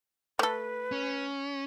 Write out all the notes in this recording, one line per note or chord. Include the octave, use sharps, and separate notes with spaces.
A3 A4 B4
C#4